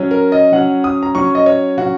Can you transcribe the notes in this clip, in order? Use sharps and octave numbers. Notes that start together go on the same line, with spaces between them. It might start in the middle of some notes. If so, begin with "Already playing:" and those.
Already playing: F#3 C#4
A#4
D#5
F#3 C#4 F#5
D#6
A#5
F#3 C#4 C#6
D#5
C#5
F#3 C#4 F#4